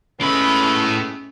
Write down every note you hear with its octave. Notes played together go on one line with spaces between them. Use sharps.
A2 G#3 A3 B3 C#4 B5